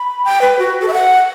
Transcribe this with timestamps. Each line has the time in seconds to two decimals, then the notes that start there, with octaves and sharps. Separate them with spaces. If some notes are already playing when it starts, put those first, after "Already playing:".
Already playing: B5
0.25 G5
0.41 B4
0.59 F#4
0.82 A4
0.88 E5
0.93 F#5